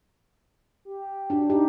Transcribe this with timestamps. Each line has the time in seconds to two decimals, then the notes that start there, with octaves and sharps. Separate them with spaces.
0.85 G4
1.30 D4 F#4
1.50 D#4 G4